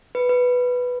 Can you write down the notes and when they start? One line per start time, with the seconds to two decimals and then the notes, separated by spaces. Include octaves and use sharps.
0.15 B4
0.29 B4